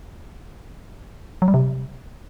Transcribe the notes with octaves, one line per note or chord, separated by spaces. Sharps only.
F#3
G3
C3